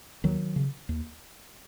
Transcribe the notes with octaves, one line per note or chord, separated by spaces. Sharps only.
D#2 D#3 F#3
C#3
D#2